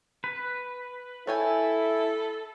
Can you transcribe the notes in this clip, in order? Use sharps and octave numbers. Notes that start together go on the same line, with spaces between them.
B4
E4 A4 C#5 G5 G#5